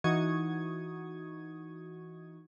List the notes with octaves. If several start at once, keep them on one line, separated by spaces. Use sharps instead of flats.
E3 D#4 F#4 C#6 D#6 G#6